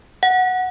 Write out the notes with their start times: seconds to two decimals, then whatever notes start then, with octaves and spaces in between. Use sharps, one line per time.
0.23 F#5